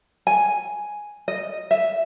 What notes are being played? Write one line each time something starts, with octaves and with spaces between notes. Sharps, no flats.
G#5
D#5
E5